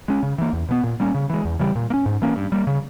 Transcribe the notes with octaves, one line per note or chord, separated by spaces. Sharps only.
G#3 C#4
C#3
E3 A#3
E2
B2 G#3 B3
A#2
G3 A#3 C#4
C#3
E3 G#3
E2
C#3 E3 G3
A#2
A#3
C#4
G#2
E3 A#3 C#4
G2
G3 A#3
C#3